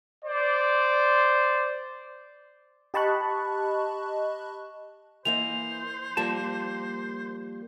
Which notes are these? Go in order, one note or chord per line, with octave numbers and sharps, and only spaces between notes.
C5 D5
G4 D#5 A5 B5 C#6 F#6
E3 A#3 C5 D#5 F7
F3 G3 A#3 A5